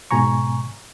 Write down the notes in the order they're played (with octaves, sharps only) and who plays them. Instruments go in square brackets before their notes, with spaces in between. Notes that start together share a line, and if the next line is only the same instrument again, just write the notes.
[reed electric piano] G#2 B2 G#5 A#5 C#6